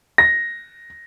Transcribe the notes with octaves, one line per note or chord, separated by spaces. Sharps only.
A#6